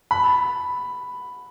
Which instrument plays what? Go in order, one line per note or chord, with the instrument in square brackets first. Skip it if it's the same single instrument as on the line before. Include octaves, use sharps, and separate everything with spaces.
[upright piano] B5